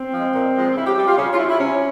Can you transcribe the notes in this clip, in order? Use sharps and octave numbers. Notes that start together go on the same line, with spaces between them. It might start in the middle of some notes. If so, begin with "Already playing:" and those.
Already playing: C4
F3 G#3
A#2
F3 G#3
C#3 E4
G4
G3 G4
F4
C#3 C#4
F4
G3 E4
E4
C3 C#4